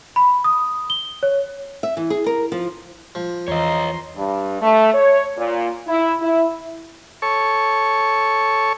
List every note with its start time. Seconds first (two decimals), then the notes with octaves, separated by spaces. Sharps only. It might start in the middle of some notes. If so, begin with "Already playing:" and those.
0.16 B5
0.44 D#6
0.90 G7
1.23 C#5
1.83 E5
1.97 E3
2.10 G#4
2.26 A#4
2.52 F3
3.15 F3
3.48 E2 E3 C#5 D#5 A#5 C6
4.16 G2
4.61 A3
4.94 C#5
5.38 A#2
5.87 E4
6.21 E4
7.22 A4 C#5 C#6